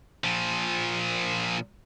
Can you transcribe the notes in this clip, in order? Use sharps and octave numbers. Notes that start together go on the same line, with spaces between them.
A#2 F3